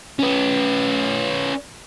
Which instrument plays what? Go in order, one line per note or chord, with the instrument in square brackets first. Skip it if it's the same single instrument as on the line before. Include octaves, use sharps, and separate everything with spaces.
[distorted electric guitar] C#4 B4